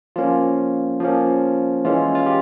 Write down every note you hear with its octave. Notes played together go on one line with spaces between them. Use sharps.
F3 A#3 C#4 F4
F3 A#3 C#4
E3 G#3 C#4 F4
F4
G4